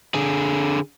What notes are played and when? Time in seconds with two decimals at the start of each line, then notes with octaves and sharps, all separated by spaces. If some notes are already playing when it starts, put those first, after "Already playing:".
0.15 D3 G#4